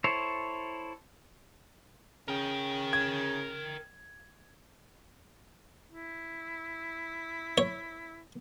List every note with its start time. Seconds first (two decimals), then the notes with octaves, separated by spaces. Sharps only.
0.04 E4 A4 C5 C#5
2.28 C#3 A#4 G5
2.93 G#6
5.91 E4
7.58 C#5